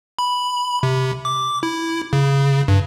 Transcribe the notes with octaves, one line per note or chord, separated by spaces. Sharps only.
B5
C3
D6
E4
C#3
G2